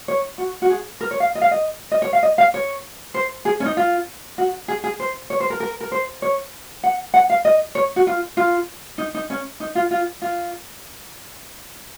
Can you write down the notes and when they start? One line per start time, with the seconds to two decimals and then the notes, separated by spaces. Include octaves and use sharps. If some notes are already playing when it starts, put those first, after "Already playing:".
0.08 C#5
0.38 F#4
0.62 F#4
0.70 G#4
1.01 A#4
1.11 C#5
1.20 F5
1.35 D#5
1.42 F5
1.51 D#5
1.92 D#5
2.02 C#5
2.13 F5
2.23 D#5
2.38 F5
2.54 C#5
3.14 C5
3.45 G#4
3.60 C#4
3.66 D#4
3.77 F4
4.38 F#4
4.68 G#4
4.84 G#4
5.00 C5
5.30 C#5
5.40 C5
5.50 A#4
5.60 A#4
5.81 A#4
5.92 C5
6.22 C#5
6.84 F#5
7.14 F#5
7.30 F5
7.45 D#5
7.75 C#5
7.96 F#4
8.07 F4
8.37 F4
8.98 D#4
9.15 D#4
9.30 C#4
9.60 D#4
9.75 F4
9.91 F4
10.22 F4